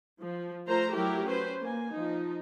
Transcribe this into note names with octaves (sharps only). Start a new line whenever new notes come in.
F3
A3 F4 A#4 C5 A#5
F#3 A3 E4 F#4 G4 A#4
C#4 B4 C5
A#3 G#5
F3 D#4